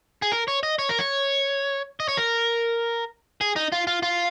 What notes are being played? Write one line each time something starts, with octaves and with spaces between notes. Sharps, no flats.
G#4
A#4
C#5
D#5
C#5
A#4
C#5
D#5
C#5
A#4
G#4
D#4
F4
F4
F4